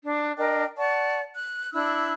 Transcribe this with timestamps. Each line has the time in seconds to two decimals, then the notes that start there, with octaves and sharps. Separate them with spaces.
0.05 D4
0.37 D4 A#4 D#5 G5
0.77 D5 F#5 A5 C#6
1.35 F#6
1.73 D4 E4 E6 F#6